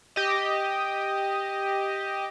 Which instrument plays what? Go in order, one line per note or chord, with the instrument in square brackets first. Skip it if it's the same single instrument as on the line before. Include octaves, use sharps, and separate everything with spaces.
[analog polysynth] G4 D#5